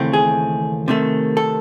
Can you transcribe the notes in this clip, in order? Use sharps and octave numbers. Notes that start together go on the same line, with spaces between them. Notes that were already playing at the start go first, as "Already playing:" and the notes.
Already playing: D#2 C#3 E3 A3 C4
G#4
C3 D#3 A3
A4